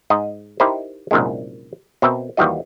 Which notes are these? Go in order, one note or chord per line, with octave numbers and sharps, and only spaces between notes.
G#2 D#5
D#4 E4 G4 A#4 C5
C2 F#2 A#2 D#3 G#3
B2 C4 A#4 E5
D#2 D#3 E3 G3 F#4 D#5